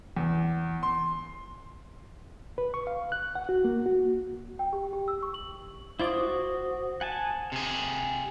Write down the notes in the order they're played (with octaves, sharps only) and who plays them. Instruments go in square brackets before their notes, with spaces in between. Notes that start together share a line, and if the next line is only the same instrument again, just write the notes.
[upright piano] E2
C6
[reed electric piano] B4
C#6
F5
F#6
F#5
F#4
A#3
F#4
[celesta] G5
G4
G4
E6
C#6
F#7
[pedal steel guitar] E4 F4 D5 [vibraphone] C5 D#6
[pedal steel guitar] F#4
F#5 G#5 A5
[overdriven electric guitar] C3 G#4